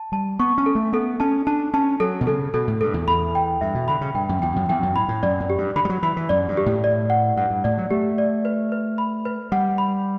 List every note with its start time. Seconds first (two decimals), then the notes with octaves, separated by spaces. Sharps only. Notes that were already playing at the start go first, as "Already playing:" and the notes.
Already playing: A5
0.12 G3 A5
0.39 B3 C#6
0.58 C#4
0.66 A4
0.75 A3
0.93 B3 A4
1.20 C#4 A5
1.47 D4 A5
1.74 C#4 A5
2.00 F#3 A4
2.21 B2
2.27 C#3 A4
2.54 B2 A4
2.68 A2
2.81 G2 A4
2.94 E2
3.07 E2 B5
3.35 G5
3.61 G2 E5
3.75 B2
3.88 D3 B5
4.01 C#3
4.15 G2 G5
4.29 F#2
4.42 E2 G5
4.56 F#2
4.69 E2 G5
4.83 F#2
4.95 A2 B5
5.08 A2
5.23 F#2 D5
5.40 F#2
5.50 G4
5.58 G2
5.76 D3 B5
5.85 G3
5.89 F#3
6.03 E3 B5
6.17 E3
6.29 F#2 D5
6.48 G2
6.57 G4
6.66 A2
6.84 D5
7.10 F#5
7.37 G2 F#5
7.50 G2
7.64 A2 D5
7.78 F#3
7.91 A3 G4
8.18 D5
8.45 B4
8.72 B4
8.98 B5
9.25 B4
9.52 G3 F#5
9.78 B5